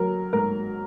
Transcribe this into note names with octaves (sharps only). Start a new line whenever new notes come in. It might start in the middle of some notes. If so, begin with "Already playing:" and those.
Already playing: F#3 A#4
G#2 A#4